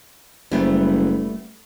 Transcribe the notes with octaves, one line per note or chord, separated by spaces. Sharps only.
F#1 G3 A3 B3